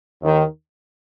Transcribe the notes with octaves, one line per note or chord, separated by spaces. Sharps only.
D#2 D#3